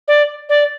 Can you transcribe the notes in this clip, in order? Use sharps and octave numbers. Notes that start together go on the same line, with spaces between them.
D5
D5